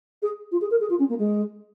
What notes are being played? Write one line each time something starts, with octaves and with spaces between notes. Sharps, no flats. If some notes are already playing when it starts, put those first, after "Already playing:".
G#4
F4
G#4
A#4
G#4
F4
C#4
A#3
G#3